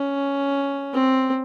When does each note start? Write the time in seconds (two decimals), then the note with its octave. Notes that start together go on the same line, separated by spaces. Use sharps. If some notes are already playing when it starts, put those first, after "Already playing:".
Already playing: C#4
0.94 C4